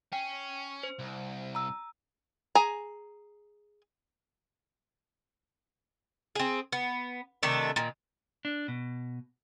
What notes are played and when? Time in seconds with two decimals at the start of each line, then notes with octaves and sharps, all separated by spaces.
0.13 C#4 G5
0.83 C5
0.99 C2
1.55 A#5 E6
2.55 G#4 G#5 A#5
6.35 C4 G#4
6.72 B3
7.43 C3 D#3 A3 D4
7.76 A#2 D#3
8.45 D4
8.68 B2